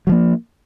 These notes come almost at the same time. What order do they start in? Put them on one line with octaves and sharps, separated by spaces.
F#3 F3 A#3